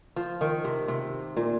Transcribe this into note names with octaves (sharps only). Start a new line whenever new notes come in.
F3
D#3
C3
C3
A#2